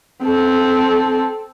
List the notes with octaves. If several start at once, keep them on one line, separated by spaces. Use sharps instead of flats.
C4 A4